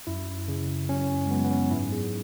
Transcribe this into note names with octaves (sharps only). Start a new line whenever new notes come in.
F#2 E4
C#3
F#2 C#4
G#3
F#3 B3
B3
C#4
G#2 E4
G#4